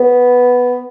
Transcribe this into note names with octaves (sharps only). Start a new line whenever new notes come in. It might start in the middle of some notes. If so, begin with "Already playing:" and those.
Already playing: B3